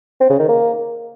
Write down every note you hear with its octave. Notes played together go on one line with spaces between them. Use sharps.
C4
C#3
D#3
A#3